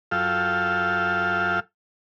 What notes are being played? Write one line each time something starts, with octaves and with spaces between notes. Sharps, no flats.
F#2 F4 A4 F5 G5 E6